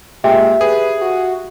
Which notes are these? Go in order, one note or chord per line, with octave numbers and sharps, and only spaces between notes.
A#2 G#3 G4 E5
G#4 B4
F#4